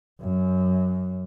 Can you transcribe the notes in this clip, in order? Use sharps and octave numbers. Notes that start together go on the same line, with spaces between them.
F#2